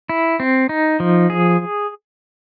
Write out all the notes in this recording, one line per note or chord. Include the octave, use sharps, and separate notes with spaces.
E4
C4
D#4
F3
G#4